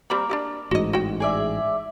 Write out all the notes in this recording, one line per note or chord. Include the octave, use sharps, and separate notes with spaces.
G3 A#3 C4 A#4 B5
D4 D#4 G4
A1 G#2 F#4 D#5
F#4 G5
G#4 D5 E5